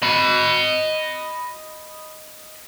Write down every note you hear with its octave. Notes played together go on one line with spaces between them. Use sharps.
D#5 B5